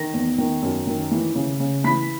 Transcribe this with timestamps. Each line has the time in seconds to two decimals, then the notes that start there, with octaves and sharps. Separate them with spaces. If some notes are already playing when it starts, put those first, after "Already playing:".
Already playing: D#3 A#6
0.14 E2
0.38 D#3
0.62 F#2
0.87 D#3
1.11 E3
1.35 C#3
1.60 C#3
1.84 E3 B5 B6